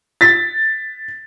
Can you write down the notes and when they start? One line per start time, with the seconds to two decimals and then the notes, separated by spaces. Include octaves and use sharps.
0.21 A6 B6